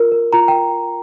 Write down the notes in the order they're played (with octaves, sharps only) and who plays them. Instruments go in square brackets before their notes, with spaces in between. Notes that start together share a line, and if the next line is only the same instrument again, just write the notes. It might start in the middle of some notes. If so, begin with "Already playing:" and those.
Already playing: [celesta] F4 A#4
A#4
F4 A#5
G5